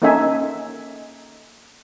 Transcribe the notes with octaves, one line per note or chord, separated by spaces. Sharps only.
A#3 C#4 D#4 A4 E5 G#5